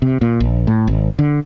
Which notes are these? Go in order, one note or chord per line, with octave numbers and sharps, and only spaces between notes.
C3
A#2
A#1
A2
G#1
D3